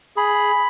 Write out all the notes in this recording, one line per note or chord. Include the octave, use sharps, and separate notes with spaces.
G#4 B5